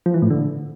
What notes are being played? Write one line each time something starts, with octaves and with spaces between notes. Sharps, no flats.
F3
E3
A2
D3